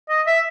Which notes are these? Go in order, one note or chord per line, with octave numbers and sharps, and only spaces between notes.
D#5
E5